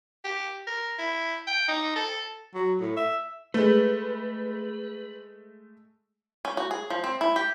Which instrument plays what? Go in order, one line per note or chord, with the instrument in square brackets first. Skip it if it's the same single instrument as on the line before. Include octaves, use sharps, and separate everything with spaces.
[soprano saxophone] G4
A#4
E4
G5
D#4
A4
[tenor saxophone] F#3
A2
E5
[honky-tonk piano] G#3 A3 [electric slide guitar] B4
[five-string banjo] C#4
F#4
G#4
F3
C4
E4
G4